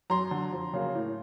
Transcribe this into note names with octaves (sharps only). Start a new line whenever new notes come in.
F#2 A#5 C6
D3 F#3
F2
C#3 F#3 A#3
A2